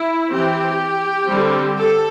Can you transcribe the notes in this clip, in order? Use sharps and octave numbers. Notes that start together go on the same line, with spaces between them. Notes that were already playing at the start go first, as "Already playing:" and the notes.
Already playing: E4
E3 C4 G4
D3 G3 C4
A4